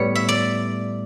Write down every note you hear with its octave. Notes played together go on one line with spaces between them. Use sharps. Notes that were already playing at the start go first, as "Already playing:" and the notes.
Already playing: A2 G3 B3 C#5
E5
D5